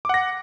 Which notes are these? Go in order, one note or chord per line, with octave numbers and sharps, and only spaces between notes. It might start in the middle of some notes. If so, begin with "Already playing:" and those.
F#5 D6 A#6